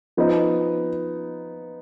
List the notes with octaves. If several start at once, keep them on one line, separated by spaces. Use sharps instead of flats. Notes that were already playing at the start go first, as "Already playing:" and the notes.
F3 B3 D#4